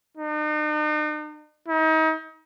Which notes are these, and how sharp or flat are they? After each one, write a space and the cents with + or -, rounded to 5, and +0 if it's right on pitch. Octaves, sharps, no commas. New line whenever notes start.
D#4 -45
D#4 +35